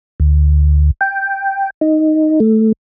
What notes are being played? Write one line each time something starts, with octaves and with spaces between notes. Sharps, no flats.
D2
G5
D#4
A3